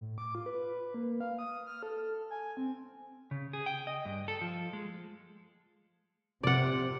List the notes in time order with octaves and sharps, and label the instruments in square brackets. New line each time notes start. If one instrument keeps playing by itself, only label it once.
[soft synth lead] A2
D6
F4
B4
A#3
F5
D#6
F6
A4
G#5
C4
[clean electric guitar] C#3
G#4
G5
D#5
G2
A4
F3
G#3
[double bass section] C3 [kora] D5 F#5